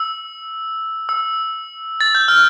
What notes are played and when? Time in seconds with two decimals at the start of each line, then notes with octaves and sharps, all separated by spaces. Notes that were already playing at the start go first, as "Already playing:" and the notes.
Already playing: E6
1.09 E6
2.01 A6
2.15 G6
2.28 F6